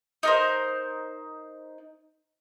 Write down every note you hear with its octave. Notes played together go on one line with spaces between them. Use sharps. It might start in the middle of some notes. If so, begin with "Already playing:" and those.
D#4 A#4 C5